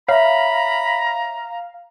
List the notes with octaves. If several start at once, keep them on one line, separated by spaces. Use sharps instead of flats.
C#5 E5 F5 A#5 B5